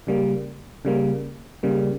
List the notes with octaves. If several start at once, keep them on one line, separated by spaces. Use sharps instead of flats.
C#3 G3 A#3
C#3 G3 A#3
C#3 G3 A#3